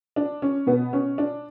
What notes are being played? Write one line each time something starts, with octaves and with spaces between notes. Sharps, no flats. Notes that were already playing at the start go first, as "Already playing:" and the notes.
D4
C#4
B2 B3
C#4
D4